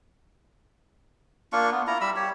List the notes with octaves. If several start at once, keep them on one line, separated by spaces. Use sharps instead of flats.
A#3 D4 F4 C#6
B3
E4 F4 A#5
G3 B5 E6
G4 C#5